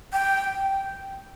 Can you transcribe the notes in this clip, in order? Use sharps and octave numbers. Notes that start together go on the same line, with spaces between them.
G5